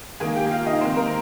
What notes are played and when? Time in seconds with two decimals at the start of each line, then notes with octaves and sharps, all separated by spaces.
0.20 D#3 A#3 G#4 G#5
0.36 G4 G5
0.51 F4 F5
0.67 D#4 D#5
0.81 D#3 A#3 C4 C5
0.96 A#3 A#4